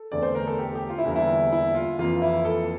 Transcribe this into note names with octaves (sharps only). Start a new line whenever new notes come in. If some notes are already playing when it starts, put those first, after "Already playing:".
Already playing: A4
E2 D3 A3 C4 D5
C5
A#4
A4
G4
G4
F4
E4
E2 D3 G3 A#3
E4
E4
F4
F2 E3 A#3 F4
E4
A4